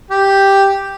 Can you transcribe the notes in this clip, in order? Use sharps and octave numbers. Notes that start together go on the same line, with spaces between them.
G4